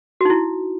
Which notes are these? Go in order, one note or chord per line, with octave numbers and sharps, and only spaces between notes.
D#4 E4 F#4